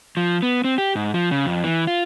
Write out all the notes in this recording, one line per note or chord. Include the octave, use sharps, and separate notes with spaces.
F3
B3
C4
G4
G#2
F3
C#3
F2
E3
F4